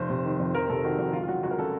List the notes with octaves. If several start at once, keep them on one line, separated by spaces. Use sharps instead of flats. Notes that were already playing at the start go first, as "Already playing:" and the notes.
Already playing: F1 C5
C3
D#3
F2
F1 A#4
C3 A4
D#3 F#4
F2 F#4
C#2 F4
F4
F#3 F#4
C#2 F#4
A#4
C#3 A4